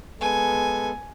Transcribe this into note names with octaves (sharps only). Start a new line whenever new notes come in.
G#3 B3 A4 G#5